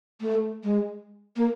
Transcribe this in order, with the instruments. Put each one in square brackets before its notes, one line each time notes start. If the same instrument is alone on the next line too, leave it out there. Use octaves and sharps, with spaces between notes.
[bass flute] A3
G#3
A#3